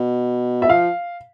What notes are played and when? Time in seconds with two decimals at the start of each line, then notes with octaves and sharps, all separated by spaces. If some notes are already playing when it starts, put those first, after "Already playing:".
Already playing: B2
0.62 E5
0.70 F3 F5